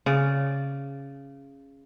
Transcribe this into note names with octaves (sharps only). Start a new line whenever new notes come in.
C#3 D5